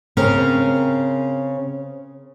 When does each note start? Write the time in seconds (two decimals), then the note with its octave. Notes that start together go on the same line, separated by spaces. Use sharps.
0.17 C#3 C4 C#4 A#4